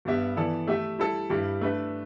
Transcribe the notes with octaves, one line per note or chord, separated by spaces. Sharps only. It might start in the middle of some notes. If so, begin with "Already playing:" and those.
G2 G3 B3 G4 E5
E3 B3 E4 A4 D5
A3 G4 E5
G3 E4 A4
G2 G3 E4 G4
A3 D4 B4 E5